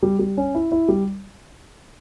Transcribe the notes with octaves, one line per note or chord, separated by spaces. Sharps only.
G3
G3
C#4
E4
E4
G3